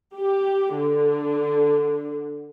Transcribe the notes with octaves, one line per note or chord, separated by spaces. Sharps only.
G4
D3